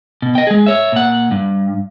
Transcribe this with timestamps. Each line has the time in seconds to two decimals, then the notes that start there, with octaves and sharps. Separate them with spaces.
0.22 B2
0.35 D#5 G5
0.47 G#3 G#4
0.66 C#5 E5
0.92 A#2 F#5
1.31 G2